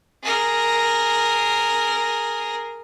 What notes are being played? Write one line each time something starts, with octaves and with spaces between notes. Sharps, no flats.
G#4 A#4